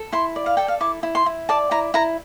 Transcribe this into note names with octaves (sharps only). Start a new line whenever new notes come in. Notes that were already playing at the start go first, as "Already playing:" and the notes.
Already playing: A4
E4 C6
D5
F5
A4 G5
F5
E4 D6
E4
C6
E4
D5 A5
E4 A#5
E4 A#5